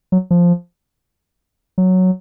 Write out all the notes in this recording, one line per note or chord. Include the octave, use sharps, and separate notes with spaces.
F#3
F3
F#3